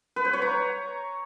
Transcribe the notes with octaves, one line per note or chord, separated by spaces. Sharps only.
B4
C5
C#5
A#5